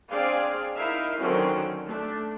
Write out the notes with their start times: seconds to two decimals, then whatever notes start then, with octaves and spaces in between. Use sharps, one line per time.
0.10 C4 D4 G#4 D5 F5 G#5
0.76 D#4 E4 A#4 E5 F5
1.18 D3 D#3 F#3 C4 C#4 F#4
1.85 A3 D4